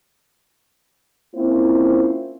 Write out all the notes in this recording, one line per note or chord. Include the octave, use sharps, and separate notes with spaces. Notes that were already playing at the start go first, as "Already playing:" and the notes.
A#3 C4 C#4 E4 F4 C5